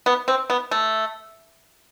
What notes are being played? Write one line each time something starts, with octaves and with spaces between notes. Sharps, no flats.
B3
C4
B3
A3